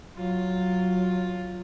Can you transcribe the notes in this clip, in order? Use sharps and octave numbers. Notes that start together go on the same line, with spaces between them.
F#3 F4